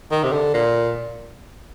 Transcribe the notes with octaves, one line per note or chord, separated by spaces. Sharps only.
D#3
C3
D3
A#2